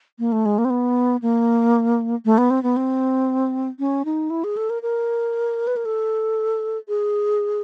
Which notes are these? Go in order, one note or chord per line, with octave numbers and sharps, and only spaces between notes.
A#3
A3
G#3
A#3
C4
B3
A#3
A3
B3
C4
B3
C4
C#4
D#4
E4
G#4
A4
A#4
A#4
B4
A#4
A4
G#4